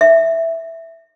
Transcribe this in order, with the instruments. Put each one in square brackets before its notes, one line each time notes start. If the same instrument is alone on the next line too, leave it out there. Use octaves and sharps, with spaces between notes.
[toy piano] E5